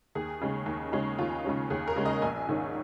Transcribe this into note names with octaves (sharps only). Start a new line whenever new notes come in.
D#2 G#4
C#3 G#3 C#4
D#2
C#3 G#3 C#4
D#2 F4
C#3 G#3 C#4
D#2 G#4
A#4
C#3 G#3 C#4
D#5
A#1 G#5
G#2 D#3 C#4